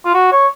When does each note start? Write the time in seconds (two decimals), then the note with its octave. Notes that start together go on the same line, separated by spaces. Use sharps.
0.05 F4
0.14 F#4
0.32 C#5